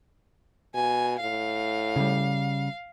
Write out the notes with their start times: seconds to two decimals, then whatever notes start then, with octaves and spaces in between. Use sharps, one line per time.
0.74 B2 G#5
1.20 A2 F5
1.96 C#3 G3